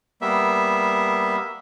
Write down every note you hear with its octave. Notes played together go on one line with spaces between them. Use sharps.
G3 A#3 B3 E5